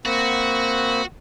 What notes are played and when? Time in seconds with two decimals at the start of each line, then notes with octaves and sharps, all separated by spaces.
0.05 A#3 C4 F#4 B5